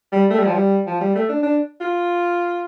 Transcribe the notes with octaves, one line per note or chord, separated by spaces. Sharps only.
G3
A3
G3
F3
G3
F3
G3
A3
D4
D4
F4